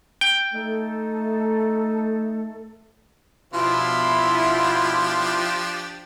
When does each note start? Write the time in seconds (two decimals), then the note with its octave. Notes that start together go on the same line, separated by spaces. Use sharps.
0.21 G5
0.54 A3 D#4 A4
3.54 B2 F3 D4 E4 F4 G4